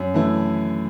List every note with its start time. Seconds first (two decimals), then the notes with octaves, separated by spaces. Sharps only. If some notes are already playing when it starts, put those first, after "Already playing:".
Already playing: F#2
0.14 E3 A3 E4